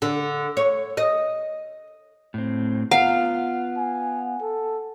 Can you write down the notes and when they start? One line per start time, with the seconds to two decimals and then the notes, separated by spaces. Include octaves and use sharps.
0.02 D3
0.57 C#5
0.97 D#5
2.34 A2 C4
2.91 B3 F4 F5 F#5
3.77 G#5
4.41 A4